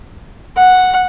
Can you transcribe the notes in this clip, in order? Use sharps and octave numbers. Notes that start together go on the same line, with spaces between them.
F#5